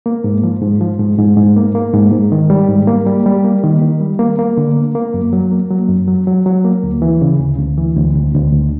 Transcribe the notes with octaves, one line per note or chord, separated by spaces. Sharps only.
A#3
G#2
F3
G#2
F3
G#2
G#2
G#2
A#3
A#3
G#2
G#2
D#3
G3
G#2
A#3
G3
G3
A#3
D#3
D#3
G3
A#3
A#3
D3
A#3
A#3
F#2
F#3
A#3
F#3
F#2
F#3
F#3
F#3
A#3
D2
E3
C#3
D2
D2
E3
D2
D2
D2
D2